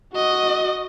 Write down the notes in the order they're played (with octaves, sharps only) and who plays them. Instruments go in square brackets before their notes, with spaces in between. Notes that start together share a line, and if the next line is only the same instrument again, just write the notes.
[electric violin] F#4 D#5